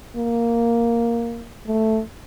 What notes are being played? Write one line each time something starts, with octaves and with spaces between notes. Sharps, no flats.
A#3
A3